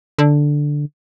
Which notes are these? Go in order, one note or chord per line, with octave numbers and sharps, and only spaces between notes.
D3